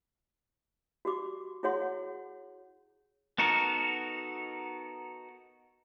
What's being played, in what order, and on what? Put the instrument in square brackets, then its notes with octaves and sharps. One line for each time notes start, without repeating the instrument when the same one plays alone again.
[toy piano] F#4 G4 D6
E4 F#4 G#4 C#5 F#5 C6
F#5
[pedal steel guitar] B3 D#4 F#4 A4 A#4